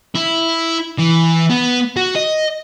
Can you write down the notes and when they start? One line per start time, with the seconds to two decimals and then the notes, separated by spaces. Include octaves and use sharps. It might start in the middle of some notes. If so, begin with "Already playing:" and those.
0.15 E4
0.99 E3
1.50 B3
1.96 F#4
2.16 D#5